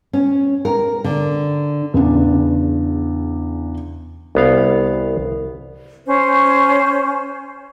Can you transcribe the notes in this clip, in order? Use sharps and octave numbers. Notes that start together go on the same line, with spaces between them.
C#4
A#4
D3
E2 C#3 D4
C2 B3 F5
C#4 C5